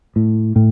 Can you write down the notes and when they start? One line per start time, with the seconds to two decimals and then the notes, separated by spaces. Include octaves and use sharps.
0.16 A2
0.56 A2